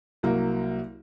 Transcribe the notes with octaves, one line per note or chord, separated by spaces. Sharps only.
C2 F#3 A#3